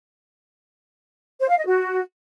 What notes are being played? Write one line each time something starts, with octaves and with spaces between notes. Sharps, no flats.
C5
F5
D#5
F#4